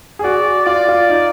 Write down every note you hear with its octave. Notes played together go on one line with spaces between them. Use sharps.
G#4
F#4 D5
F4 D5
F4
D#4